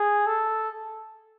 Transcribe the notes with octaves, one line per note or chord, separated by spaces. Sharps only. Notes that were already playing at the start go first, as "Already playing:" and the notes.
Already playing: G#4
A4